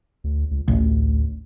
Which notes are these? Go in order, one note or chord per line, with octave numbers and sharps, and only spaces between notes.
D2
C#2
A1 D2